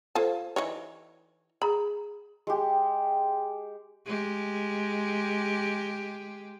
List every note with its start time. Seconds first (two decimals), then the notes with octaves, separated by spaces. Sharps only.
0.15 F4 A4 C5 F5 A5
0.56 E3 D#4 C#5
1.62 G#4 A#5 B5
2.47 G#3 G4
4.06 G#3 G4